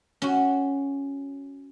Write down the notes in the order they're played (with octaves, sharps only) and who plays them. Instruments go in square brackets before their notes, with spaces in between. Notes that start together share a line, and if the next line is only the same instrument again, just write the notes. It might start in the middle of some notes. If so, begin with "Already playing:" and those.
[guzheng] C#4 F#4